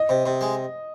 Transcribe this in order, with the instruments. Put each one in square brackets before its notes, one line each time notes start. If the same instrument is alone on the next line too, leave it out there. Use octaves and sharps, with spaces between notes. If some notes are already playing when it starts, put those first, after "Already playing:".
Already playing: [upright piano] D#5
[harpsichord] C3
C3
G#3